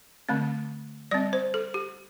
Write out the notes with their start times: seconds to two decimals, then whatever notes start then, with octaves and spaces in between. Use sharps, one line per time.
0.29 D3 A3 C4
1.11 G3 C4 D5
1.33 C5
1.54 A4
1.74 G4